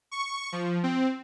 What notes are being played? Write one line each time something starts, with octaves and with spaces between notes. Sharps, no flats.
C#6
F3
C4